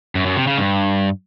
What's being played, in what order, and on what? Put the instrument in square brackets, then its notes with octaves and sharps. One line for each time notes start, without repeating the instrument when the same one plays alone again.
[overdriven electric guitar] F#2
F#2
C3
C#3
G2